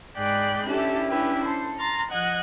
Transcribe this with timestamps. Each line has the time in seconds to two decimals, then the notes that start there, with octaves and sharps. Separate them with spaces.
0.16 G#2 G#4 D5 G5 B5 F#6
0.65 C#4 D4 E4 G4 A4
1.07 C#4 D4 E4 G4 B4
1.44 A4 C5
1.78 A#5 C6 F6 A6
2.11 F3 D#5 F#5 F#6 G#6